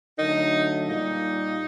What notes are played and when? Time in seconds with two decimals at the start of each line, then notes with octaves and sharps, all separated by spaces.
0.17 D3 F#3 A3 D#4
0.87 A#2 G3 A#3 D#4